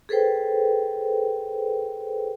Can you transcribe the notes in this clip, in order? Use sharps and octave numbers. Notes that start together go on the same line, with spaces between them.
G#4 A4 B4 C5 G5